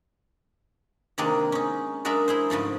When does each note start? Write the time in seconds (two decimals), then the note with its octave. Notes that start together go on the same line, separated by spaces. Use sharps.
1.18 C3 D#3 G#3 A#3 D4
1.52 C#4 D#4
2.05 F#3 G#3 D4 A#4 E5
2.28 E4 G#4 C5
2.50 G#2 C#3 F3 A3